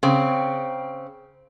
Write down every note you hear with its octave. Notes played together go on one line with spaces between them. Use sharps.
C#3 C4